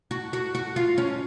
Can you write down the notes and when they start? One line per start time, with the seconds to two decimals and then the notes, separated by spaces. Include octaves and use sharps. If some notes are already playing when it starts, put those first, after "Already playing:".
0.11 F#4
0.33 F#4
0.55 F#4
0.76 F4
0.98 C#4